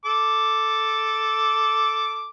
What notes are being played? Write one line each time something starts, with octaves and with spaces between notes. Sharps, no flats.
A4 D6